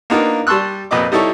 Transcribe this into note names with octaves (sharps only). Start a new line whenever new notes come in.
A#3 B3 D4 D#4 F4 A#4
G3 A5 C6 C#6 E6 F#6
F2 A#2 B4 D#5 D6
G3 D#4 E4 A4 C#5